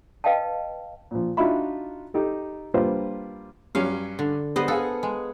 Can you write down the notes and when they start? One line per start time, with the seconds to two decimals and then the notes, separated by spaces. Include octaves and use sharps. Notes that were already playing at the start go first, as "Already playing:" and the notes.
0.24 B4 D#5 F5 G5 A5
1.11 A#2 F3
1.37 D4 D#4 F4 F#4 E5 B5
2.14 D#4 G4 A4
2.74 G3 A#3 D4 F4 B4 C5
3.75 G2 F#3 C#4 F5
4.19 D3
4.56 G3 B3 C5 D#5
4.68 G#4 A4 F5 F#5
5.03 G#3